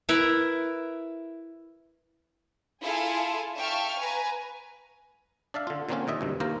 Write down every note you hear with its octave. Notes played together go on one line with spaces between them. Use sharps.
E4 A#4 B4 E5
E4 F4 G#4 A4 F5 G#5
E5 F5 G5 A5 C#6 F6
B4 G#5 A#5
D4 D5 E5 F5
D3 F4
A#2 D3 A#3 C4 C#4 F4
D#2 A#2 D#5 E5
D2 G2 C3
D#2 A#3 C5 F5 A#5